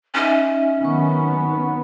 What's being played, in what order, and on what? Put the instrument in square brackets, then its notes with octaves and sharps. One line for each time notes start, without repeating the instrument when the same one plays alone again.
[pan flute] C#4 [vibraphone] D#4 D#5 E5
[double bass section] D#3 F#3 B3 [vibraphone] D#4 C#6